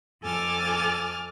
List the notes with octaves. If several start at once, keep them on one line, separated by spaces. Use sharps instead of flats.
F2 A4 G#5 D6 F6 A6